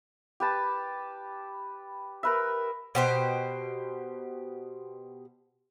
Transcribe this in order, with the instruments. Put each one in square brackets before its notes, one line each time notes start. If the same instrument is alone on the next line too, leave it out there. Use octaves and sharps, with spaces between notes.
[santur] G4 B4 A5
A#4 B4 E5
[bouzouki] B2 G4 C5